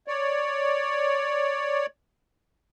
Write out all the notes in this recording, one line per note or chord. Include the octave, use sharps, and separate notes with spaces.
C#5 D5